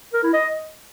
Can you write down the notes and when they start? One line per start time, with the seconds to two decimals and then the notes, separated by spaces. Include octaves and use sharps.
0.13 A#4
0.23 E4
0.33 D#5